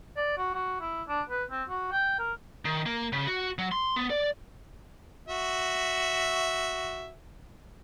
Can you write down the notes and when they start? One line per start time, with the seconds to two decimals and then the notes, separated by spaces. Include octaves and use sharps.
0.17 D5
0.38 F#4
0.55 F#4
0.81 E4
1.08 D4
1.30 B4
1.51 C4
1.69 F#4
1.92 G5
2.19 A#4
2.65 D#3
2.86 A#3
3.12 C#3
3.27 F#4
3.58 F#3
3.72 C6
3.96 B3
4.10 D5
5.28 F#4 E5